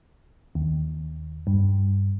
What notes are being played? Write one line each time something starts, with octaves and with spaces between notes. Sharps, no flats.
D#2
G2